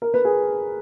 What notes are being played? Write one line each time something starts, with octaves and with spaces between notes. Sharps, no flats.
A#4
B4
G#4